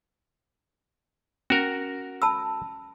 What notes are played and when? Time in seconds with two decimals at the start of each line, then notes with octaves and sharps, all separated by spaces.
1.50 C#4 F#4 A#4
2.22 A5 B5 E6